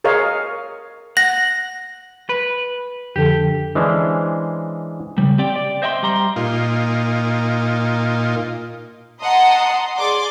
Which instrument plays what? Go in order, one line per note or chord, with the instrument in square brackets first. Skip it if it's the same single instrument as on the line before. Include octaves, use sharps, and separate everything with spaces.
[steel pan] G#4 A#4 C#5 D#5 F5
[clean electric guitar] F#5 [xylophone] A#6
[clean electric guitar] B4
[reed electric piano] F2 D3 A4 [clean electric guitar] G4
[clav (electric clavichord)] E3 G#3 C#4 D4 C5
[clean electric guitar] C#3 G3
C4 G4 D5 G5
D5
C5 D#5 E5 G5 A5 C6
G3 A#5 C6
[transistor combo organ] A#2 D#4 F4
[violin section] D#5 F#5 A5 A#5 C6 D#6
G#4 D5 C6 D6